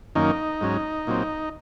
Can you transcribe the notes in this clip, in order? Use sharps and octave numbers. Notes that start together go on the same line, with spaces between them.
F#2 D#3 A#3 C#4 D#4
G#2 F#3 C#4
A#2 F#3 C4